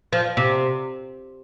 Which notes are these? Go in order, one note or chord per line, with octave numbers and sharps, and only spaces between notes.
F3
C3